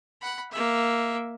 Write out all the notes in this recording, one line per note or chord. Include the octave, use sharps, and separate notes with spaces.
F#5 B5
A#3 E5